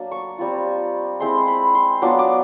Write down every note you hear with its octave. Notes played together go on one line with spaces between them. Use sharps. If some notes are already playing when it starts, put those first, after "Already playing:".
Already playing: F#3 A#3 D4
C#6
G3 C4 F4
G#3 C4 E4 C6
B5
C6
F#3 B3 D4 F4 D6
D6